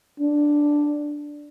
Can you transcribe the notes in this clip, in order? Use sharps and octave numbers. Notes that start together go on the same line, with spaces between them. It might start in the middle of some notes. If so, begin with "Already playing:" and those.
D4